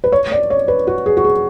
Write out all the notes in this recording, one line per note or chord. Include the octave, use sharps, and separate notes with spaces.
B4
C#5
D5
C#5
B4
F#4
G#4
F#4
G#4